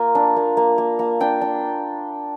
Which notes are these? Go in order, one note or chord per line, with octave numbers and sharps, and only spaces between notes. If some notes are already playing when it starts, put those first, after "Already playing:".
Already playing: A#3 F4
D4
A#3
A#3
A#3
A#3
D4 G5
D4